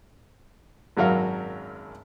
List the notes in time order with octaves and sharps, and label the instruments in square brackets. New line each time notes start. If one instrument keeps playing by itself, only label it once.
[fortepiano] G#1 F#2 F#3 A#4 F5